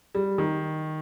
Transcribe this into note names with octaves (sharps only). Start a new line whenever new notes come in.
G3
D#3